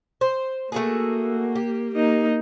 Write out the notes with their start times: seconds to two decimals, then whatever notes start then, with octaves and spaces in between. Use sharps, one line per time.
0.21 C5
0.72 A3 A#3 F#4 G#4
1.55 G4
1.95 A#3 D#4